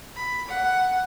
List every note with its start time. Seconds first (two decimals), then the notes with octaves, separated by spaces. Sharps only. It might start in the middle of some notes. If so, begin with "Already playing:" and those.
0.15 B5
0.48 F#5